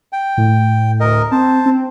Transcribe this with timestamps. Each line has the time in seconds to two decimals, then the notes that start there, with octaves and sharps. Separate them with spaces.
0.13 G5
0.37 A2
1.00 D2 A#4 D#5
1.31 C4 C5 A5
1.66 C4